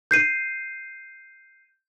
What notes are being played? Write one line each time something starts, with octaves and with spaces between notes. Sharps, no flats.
G6 C7 D#7